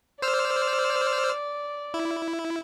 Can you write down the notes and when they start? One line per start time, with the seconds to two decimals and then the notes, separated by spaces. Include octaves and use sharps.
0.22 C5 D5 E6 F6
1.94 E4